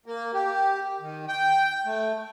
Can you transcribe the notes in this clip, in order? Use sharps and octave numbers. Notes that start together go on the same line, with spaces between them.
A#3
G4
D#3
G5
A3